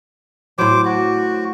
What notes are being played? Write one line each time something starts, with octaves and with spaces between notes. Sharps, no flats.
A2 F#3 C5 D6
F#4